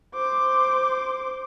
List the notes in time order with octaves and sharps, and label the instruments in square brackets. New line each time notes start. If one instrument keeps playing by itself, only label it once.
[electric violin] C5 D6